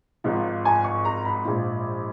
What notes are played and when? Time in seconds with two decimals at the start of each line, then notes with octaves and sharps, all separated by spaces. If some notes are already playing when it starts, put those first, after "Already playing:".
0.24 G#1 G#2 F3
0.65 G#5
0.84 C#6
1.05 A#5
1.25 B5
1.45 A#1 G#2 F3